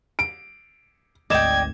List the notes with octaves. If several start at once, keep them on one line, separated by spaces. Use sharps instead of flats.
D7
G#1 D2 D5 D#5 G5 G#6 E7